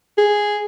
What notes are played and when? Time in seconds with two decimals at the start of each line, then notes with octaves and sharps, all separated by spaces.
0.18 G#4